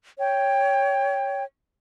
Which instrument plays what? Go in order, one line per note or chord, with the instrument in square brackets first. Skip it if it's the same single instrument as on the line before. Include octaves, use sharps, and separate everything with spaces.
[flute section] C#5 G5